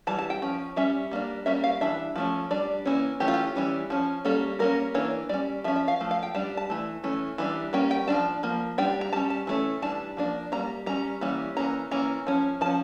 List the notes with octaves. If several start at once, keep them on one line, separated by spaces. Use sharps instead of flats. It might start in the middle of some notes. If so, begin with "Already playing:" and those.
E3 G3 A5
A5
G5
F3 C#4
G3 C#4 E5
G3 A#3 D4
G3 A#3 C#4 E5
F5
E3 G3 D4 E5
F3 A3 C#4
G3 D4 D5
E3 A#3 C#4
E3 A3 C#4 G4
F4
G4
E3 G3 C#4
F3 C#4
G3 A#3 C#4 A4
G3 A#3 C#4 A#4
E3 A#3 D4 C#5
G3 C#4 D5
F3 C#4 E5
E5
F5
F3 A3
F5
G5
G3 D4 A5
A5
E3 A3
E3 A3 C#4
E3 G3 D4
G3 A#3 C#4 G5
G5
F3 A#3 D4 A5
F3 A#3
G3 D4 G5
A#5
G3 C#4 A5
A5
E3 A3 C#4
E3 G3 D4 A5
F3 A#3 D4
G3 A#3 C#4 A#5
G3 C#4 A#5
E3 G3 A#3 C#4
E3 A#3 C#4 A#5
E3 A#3 C#4 A#5
F3 C#4
F3 C#4 A5